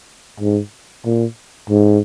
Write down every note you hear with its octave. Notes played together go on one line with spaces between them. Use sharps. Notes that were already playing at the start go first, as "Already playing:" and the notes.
G#2
A#2
G#2